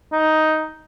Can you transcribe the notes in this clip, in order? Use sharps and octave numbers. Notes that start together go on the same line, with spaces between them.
D#4